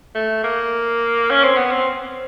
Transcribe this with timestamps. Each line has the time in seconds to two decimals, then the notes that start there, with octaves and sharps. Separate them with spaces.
0.15 A3
0.44 A#3
1.30 C#4
1.43 C4
1.57 B3
1.71 C4